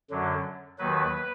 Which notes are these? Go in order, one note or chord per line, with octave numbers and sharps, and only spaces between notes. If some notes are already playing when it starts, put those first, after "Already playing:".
F#2 D3 F#3
D#2 D#3 F#3 B4